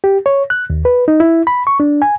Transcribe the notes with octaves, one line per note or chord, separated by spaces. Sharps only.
G4
C#5
F#6
D#2
B4
D#4
E4
B5
C#6
D4
G#5